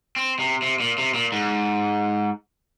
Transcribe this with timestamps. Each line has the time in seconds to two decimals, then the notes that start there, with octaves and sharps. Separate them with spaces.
0.16 C4
0.39 C3
0.62 C3
0.80 A#2
0.98 C3
1.14 A#2
1.32 G#2